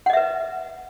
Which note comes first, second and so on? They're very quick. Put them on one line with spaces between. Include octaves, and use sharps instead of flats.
F#5 D#5 E5 B4